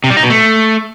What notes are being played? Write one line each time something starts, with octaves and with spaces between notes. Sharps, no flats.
C3
G3
D#4
B2
A3